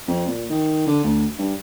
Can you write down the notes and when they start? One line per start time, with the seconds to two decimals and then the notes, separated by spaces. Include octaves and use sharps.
0.07 F2
0.27 A#2
0.50 D#3
0.87 D3
1.04 D2
1.38 G2